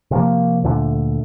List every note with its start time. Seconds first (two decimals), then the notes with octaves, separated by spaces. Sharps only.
0.11 C3 F3 A#3
0.64 D2 A#2 D3 A3